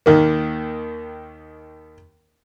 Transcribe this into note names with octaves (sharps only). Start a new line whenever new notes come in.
D#2 D#3 A#3